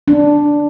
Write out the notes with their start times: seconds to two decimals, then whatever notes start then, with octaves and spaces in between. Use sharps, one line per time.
0.08 D4